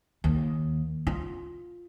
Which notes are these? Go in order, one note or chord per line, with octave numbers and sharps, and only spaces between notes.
D#2
F4